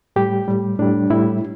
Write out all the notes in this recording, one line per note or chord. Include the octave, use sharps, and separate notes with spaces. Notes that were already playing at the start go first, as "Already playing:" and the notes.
A2 G3 G4
A2 G3
A2 G3 D4
A2 G3 E4